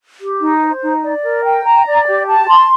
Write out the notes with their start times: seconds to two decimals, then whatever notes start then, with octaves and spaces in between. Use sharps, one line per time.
0.20 G4
0.41 D#4
0.62 C5
0.82 D#4
1.03 D5
1.23 A#4
1.44 G5
1.65 A#5
1.86 D5
2.07 G4
2.27 A5
2.48 C6